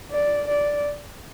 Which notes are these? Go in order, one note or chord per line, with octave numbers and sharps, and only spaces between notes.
D5
D5